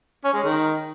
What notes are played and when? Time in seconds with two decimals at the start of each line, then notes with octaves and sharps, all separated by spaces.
0.25 C#4
0.34 G#3
0.44 D#3